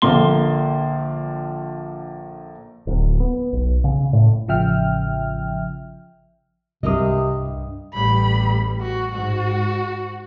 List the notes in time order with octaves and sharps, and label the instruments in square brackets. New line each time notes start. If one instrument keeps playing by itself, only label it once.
[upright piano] A#1 D3 A#3 C6 G7
[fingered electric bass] D1
B3
B1
C#3
A2
[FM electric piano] A1 C#3 F3 E5 G5 F6
[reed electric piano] C2 D#6 [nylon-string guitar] G2 A#4 D#5 [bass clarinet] C3
[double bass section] A1 G3 [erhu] B5
[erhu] F#4
[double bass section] G#2 [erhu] F#4